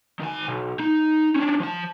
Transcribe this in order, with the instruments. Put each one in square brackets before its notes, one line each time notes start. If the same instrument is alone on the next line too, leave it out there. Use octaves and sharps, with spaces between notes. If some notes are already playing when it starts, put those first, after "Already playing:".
[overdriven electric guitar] D#3 G#5
B1
D#4
C#4 D4
F3 A5